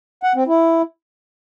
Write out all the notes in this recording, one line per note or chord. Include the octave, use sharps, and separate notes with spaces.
F#5
C4
E4